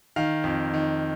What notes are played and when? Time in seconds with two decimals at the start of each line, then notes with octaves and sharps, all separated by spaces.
0.16 D#3 F5
0.44 F2
0.73 D#3